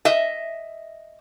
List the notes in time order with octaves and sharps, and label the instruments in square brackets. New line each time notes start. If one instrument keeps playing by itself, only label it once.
[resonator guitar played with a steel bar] D#5 E5